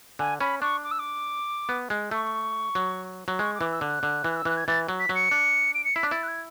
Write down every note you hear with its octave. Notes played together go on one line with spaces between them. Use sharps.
D3 G#5
C#4 B5
D4 C#6
D6
E6
D6
B3
G#3
A3 C#6
F#3
F#3
G#3 C#6
D6
E3
E6
D3
F#6
D3
E3
E6
E3 F#6
G#6
E3 A6
F#3
B6
F#3
C#7
D4
D7
C#7
E4 B6
D4
E4 A6
F#6
G#6